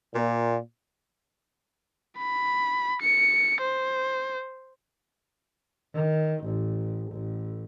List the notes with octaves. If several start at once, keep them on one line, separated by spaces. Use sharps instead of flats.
A#2
B5
C#7
C5
D#3
A1
A1